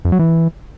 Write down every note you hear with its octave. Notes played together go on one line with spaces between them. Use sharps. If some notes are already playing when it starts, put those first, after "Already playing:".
F2
F#3
E3